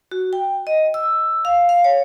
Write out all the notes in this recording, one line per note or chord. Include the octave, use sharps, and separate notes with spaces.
F#4
G5
D#5
E6
F5
F5
C#5